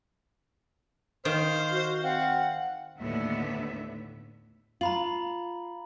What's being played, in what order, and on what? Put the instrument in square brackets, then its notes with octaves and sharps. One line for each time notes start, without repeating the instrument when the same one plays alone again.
[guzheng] D#3 [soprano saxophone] C5 [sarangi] F5
[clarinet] F#4
[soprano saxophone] C4 [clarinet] F5 [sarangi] F#5
[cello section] D#2 A2 D3 B3 E5
[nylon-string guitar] F4 [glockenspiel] A#5 B5 F#7